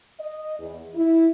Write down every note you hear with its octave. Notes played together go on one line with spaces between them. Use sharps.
D#5
E2
E4